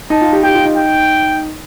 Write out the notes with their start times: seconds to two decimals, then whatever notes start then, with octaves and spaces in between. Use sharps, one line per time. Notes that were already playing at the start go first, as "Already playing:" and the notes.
0.10 D#4 A5
0.21 F4
0.33 G4
0.43 G4 G5
0.54 F4
0.65 D#4
0.76 G5